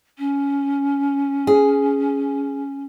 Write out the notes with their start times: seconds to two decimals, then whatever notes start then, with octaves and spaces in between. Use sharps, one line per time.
0.18 C#4
1.47 G#4